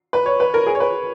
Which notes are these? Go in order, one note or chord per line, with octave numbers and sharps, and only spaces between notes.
B4
C#5
B4
A#4
G#4
C#5
B4